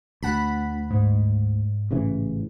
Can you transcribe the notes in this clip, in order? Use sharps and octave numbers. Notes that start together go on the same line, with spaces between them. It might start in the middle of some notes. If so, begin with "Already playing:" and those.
D2 F#5 A5 B5
G#2
A1 C#3 E3